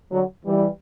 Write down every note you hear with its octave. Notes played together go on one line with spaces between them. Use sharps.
D3 F#3
E3 G3